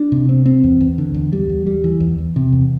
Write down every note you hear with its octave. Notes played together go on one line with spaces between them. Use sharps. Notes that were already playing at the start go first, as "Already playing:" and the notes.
Already playing: D4
C3
C4
C4
E2
E2
D3
E2
G3
E2
G3
E3
E2
E2
C3
E2